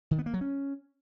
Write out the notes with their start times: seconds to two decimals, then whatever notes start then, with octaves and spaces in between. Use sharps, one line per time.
0.11 D#3
0.19 B3
0.26 A#3
0.34 F#3
0.41 C#4